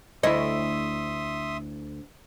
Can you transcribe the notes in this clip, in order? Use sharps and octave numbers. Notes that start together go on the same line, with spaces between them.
D2 E4 C#5 D#5 E5 C6 D#6